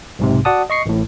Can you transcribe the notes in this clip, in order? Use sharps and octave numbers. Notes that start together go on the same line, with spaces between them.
B1 G#2 C3
F#4 D5 F#5 A5 D#6
D#5 C#6 C7 C#7
A1 A2